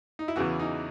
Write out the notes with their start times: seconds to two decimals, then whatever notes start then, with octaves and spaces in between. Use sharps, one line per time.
0.19 D#4
0.28 E4
0.36 E2 C#3 E3 F#4
0.59 D#4